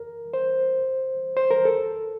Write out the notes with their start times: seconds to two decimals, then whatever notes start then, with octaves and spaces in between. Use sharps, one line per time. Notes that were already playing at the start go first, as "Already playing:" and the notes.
Already playing: A#4
0.34 C5
1.37 C5
1.51 A#4
1.65 A4